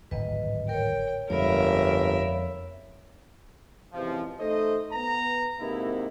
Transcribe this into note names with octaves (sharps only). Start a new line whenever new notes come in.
D1 G#1 B4 D#5
A#4 C#5 G5
G1 F2 G#3 A#4 C#5 E5 F5 B5
C#2 C3 E3 F3
A3 D#4 A4 C5 D#5
B3 A#5
G#2 C3 A#3 D#4 E4